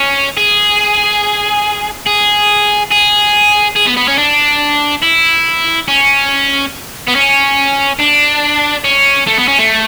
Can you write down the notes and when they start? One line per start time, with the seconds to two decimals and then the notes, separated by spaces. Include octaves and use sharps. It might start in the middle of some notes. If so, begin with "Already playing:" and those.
Already playing: C#4
0.37 G#4
2.06 G#4
2.91 G#4
3.76 G#4
3.87 B3
3.97 B3
4.08 C#4
4.18 D4
5.03 E4
5.88 C#4
7.07 B3
7.15 C#4
8.00 D4
8.84 C#4
9.27 A3
9.38 B3
9.48 C#4
9.59 A3